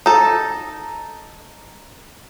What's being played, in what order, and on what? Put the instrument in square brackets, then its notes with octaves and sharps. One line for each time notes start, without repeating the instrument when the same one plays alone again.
[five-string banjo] D#4 A4